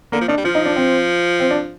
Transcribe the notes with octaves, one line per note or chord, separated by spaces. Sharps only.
D3 A#3
F3
D#3 D4
G3
F3 F4
D#4
D4
C4
C4
D4